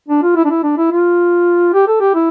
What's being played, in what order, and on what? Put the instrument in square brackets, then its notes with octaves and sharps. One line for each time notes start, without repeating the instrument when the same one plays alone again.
[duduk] D4
F4
E4
D4
E4
D4
E4
F4
G4
A4
G4
E4